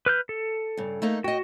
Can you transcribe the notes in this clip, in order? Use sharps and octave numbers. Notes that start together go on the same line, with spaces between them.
B4 F6 G6
A4
G2 C#3
A3 A#3 D#4
F#4 D#5 G5